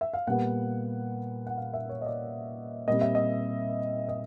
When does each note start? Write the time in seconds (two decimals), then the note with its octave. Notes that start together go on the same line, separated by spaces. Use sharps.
0.01 E5
0.14 F5
0.27 A#2 G3 B3 F#5
1.47 F#5
1.57 F5
1.74 E5
1.89 C#5
2.02 D#5
2.06 D5
2.88 A#2 G3 C4 D#5
3.01 E5
3.15 D#5
4.09 D#5